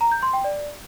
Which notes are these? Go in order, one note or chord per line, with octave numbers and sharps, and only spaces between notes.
A#5
G6
C6
G5
D5